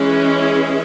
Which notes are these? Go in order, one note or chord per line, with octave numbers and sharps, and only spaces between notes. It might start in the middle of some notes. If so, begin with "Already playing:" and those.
Already playing: E3 G#3 C#4
G#4